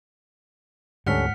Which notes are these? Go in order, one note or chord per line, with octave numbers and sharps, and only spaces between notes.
D2 G#2 G3 C#4 A4 F#5 F6 B6